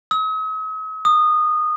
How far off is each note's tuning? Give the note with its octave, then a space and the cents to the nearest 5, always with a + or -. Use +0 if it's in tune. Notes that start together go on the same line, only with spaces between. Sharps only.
D#6 +45
D#6 -20